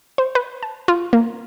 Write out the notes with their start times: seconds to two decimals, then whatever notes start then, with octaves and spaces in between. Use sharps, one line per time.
0.18 C5
0.35 B4
0.63 A5
0.88 F4
1.13 A#3